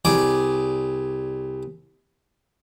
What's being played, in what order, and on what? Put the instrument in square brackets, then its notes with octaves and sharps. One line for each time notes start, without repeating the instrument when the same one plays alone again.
[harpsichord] C2 G#4 D5 D6